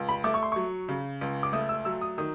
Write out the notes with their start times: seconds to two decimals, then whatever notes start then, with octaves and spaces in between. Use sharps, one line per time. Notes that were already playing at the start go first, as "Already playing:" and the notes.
Already playing: C#2
0.09 B5
0.24 A3 D6
0.34 C#6
0.43 C6
0.52 F#3 C#6
0.89 C#3
1.21 C#2
1.43 D6
1.53 A3 D#6
1.69 E6
1.85 F#3 E6
2.01 D#6
2.18 D#3 D#6